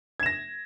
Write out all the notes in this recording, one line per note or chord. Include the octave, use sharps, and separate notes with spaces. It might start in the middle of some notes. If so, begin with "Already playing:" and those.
G#6 A#6 E7